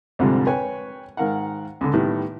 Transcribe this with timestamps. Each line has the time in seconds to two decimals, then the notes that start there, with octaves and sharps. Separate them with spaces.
0.19 C2 F2 G#2 D3 F3 G3
0.47 B4 C#5 G5 G#5
1.17 G#2 D#3 A#4 F5 F#5
1.81 C#2 D3
1.93 A2 D#3 G3 B3